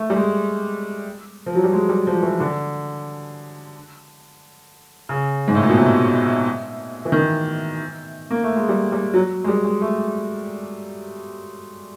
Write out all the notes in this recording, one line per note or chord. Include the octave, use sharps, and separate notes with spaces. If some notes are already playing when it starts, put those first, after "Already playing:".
Already playing: A3
G3
G#3
F3
F#3
G3
G#3
G3
F3
E3
D3
C#3
G#2
A2
A#2
B2
C3
E3
D#3
A#3
A3
G#3
G3
G3
F#3
G#3
G3
G#3
A3